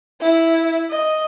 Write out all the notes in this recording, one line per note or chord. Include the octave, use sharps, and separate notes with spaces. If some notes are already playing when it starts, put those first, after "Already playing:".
E4
D#5